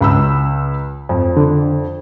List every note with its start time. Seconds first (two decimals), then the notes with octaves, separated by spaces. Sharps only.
0.01 C#2 B5 E6
1.09 F2
1.37 D3